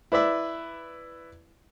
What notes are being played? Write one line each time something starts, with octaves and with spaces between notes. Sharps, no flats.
E4 B4 D5 E5